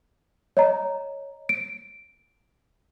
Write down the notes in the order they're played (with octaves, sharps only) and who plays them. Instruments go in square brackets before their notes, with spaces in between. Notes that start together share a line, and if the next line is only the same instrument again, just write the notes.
[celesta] C#5 D#5 A#5
D7